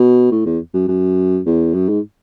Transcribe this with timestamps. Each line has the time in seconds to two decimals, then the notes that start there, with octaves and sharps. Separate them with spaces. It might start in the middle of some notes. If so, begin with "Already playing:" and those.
Already playing: B2
0.31 A2
0.46 E2
0.74 F#2
0.88 F#2
1.46 E2
1.74 F#2
1.89 G#2